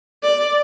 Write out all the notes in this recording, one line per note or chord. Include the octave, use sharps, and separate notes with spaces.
D5